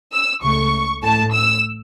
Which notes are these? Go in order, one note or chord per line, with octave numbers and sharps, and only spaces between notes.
E6
C#2 C#3 A3 C#6
A1 A2 A3 A5
E6